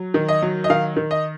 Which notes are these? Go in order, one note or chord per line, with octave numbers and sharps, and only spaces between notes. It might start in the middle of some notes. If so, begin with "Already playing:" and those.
Already playing: F#3
D#3
D#5
F#3
D#5
D#3 F5
D#3
D#5